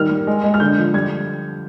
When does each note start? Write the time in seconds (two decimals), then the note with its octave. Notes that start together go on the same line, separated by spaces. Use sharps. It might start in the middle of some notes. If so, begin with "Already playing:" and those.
Already playing: D#3 G3 F6
0.10 G3
0.27 G#3
0.44 G#3
0.54 F6
0.60 D3 G6
0.78 F3
0.94 G3 G#6